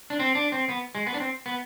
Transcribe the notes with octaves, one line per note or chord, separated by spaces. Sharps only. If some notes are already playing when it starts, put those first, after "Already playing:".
D4
C4
D4
C4
B3
G#3
B3
D4
C4
B3